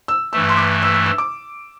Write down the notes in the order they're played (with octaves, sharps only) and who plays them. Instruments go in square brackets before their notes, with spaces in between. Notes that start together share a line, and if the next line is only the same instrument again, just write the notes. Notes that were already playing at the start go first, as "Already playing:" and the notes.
[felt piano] E6
[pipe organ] G2 E3 A3 [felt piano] E6
[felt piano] C6
D6
E6
E6
E6
D6